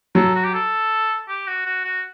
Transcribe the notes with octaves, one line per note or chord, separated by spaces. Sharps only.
F#3 A4
F#4
G4
A4
G4
F#4
F#4
F#4